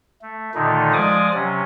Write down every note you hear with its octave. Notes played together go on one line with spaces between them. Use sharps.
A3
A#2 D3 D#3 A3 D#4
F3 G#3 D5 G#5 D6 D#6
C3 F#3 C#4